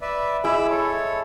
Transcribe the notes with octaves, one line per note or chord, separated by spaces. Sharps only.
B4 D5 E5
G#3 E4 B5 D6 E6
A4 C#5